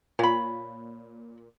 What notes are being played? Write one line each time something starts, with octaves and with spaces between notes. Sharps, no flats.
A#2 C#5 B5